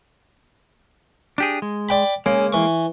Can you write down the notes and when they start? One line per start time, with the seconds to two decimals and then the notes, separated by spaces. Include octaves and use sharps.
1.38 D4 G4 G#4
1.62 G#3
1.89 D5 G5 B5
2.26 C#3 G#3 A#3
2.53 E3 C#6